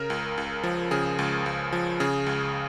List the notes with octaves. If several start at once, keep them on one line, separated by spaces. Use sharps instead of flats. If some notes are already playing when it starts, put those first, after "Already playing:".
Already playing: C#3 A#4
C#2
C#2
F3
C#3 G#4
C#2
C#2
F3
C#3 G#4
C#2